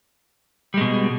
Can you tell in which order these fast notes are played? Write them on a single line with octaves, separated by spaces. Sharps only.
G3 G#3 B2